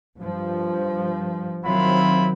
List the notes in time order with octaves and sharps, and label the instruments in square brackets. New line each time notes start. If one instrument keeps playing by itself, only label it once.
[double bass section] G2 F3
[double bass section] D#3 F#3 C4 [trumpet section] E4 F4 B5